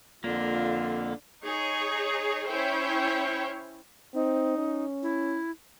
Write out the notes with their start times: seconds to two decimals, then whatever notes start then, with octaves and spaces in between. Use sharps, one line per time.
0.24 F2 D3 A#3 D4 F4
1.44 D#4 G#4 C#5
2.47 C#4 E4 C5 C#5 G5
4.14 C4 D#4
4.58 C#4
5.03 E4